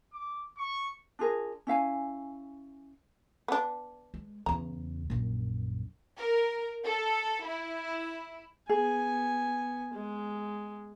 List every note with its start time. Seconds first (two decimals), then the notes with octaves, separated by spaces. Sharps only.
0.13 D6
0.58 C#6
1.19 D4 F4 G#4 A#4
1.67 C#4 E4 F5 G#5
3.48 B3 D4
4.14 G#3
4.46 E2 C#3 A#5
5.10 A#1 F#2
6.17 A#4
6.86 A4
7.45 E4
8.69 B3 G#4 G#5
9.94 G#3